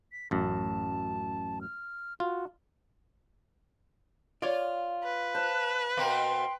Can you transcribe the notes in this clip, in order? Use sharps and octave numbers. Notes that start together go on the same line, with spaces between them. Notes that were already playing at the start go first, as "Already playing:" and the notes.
B6
A1 F#2 A5
F6
F4 F#4
F4 C#5 D5
B4
C5 A5 F#6
B2 A#3 C4 G5 C6